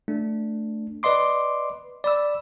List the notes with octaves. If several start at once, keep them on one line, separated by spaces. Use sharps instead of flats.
A3 D4
B4 D5 D#5 C6 D6
D5 B5 E6